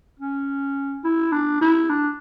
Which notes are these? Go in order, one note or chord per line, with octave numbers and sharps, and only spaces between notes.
C#4
E4
D4
E4
D4